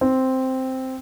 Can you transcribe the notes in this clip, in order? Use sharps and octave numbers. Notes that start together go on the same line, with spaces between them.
C4